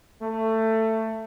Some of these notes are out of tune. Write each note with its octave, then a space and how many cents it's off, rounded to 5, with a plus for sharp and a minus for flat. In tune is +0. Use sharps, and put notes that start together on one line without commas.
A3 +15